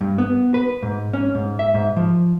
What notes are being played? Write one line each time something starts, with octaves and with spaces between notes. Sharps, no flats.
G2
B3
B4
G#2
C#4
G#2
E5
G#2
F3